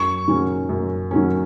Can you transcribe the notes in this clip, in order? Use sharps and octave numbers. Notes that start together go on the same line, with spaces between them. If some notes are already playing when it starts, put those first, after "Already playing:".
Already playing: F#2 C#6
D#3 F#3 C#4
F#2
D#3 F#3 C#4